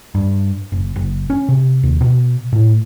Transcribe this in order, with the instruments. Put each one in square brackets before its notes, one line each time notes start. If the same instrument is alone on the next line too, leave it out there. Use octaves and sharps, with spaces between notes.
[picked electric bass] G2
F#1
F#1
C#4
C3
D#2
B2
A2